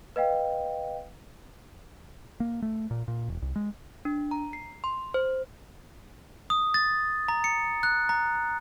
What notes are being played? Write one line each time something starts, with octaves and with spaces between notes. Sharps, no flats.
B4 D#5 F5 G5
A#3
A3
A#2
A#2
E1
C2
G#3
D4
A#5
C7
C6
C5
D#6
A6
A#5
C#7
F#6
A#5